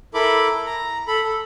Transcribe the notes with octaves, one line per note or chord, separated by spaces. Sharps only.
E4 A4 A#4 B5 D6
A#5
A4 B5
A4